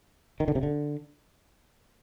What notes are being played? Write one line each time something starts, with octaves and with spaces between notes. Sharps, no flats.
D#3
D3
C3
D3